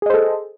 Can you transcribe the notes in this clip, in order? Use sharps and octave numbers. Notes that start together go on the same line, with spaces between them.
G#4 A4 C5 D#5